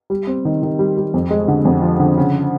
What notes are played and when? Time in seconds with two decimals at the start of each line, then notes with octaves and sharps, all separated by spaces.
0.10 G3
0.27 C4
0.45 D#3
0.63 D#3
0.79 G3
0.97 G3
1.14 F2
1.30 G#3
1.48 D3
1.65 F2
1.82 F3
2.00 D3
2.17 C#3